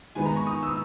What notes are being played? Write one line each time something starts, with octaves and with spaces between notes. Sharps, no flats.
D#3 G#3 B3 G#5
A#5
C#6
D#6
E6